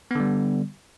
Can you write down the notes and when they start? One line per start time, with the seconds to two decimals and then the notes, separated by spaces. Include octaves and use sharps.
0.11 B3
0.15 D3
0.20 G3